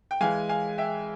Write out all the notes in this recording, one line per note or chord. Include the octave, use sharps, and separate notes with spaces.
G5
E3 G#3 F5 G#5
F5 G#5
E5 G5